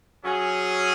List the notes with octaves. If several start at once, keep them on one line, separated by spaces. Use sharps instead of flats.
F#3 C#4 G#4